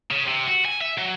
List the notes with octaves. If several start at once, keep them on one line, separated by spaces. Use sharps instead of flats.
C#3
C3
F#4
G#5
E5
F#3